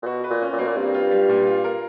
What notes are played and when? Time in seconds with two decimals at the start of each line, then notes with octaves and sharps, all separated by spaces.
0.02 A#2
0.06 B2 F#4
0.24 B4
0.30 A#2
0.42 C#4
0.53 A#2
0.59 B2 A#3
0.67 A#2
0.76 G2 C4
0.94 F4
1.11 G3
1.29 A#2
1.47 F4
1.64 A#4